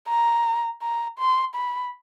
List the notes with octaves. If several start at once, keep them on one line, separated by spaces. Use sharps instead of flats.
A#5
A#5
C6
B5